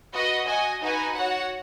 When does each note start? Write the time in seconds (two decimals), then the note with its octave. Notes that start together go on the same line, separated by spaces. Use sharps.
0.12 F#4 B4 D#5
0.46 F#4 D#5 G#5
0.81 D#4 F#4 B4 G#5
1.15 F#4 C#5 F#5